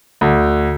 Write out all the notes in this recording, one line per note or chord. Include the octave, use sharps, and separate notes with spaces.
D2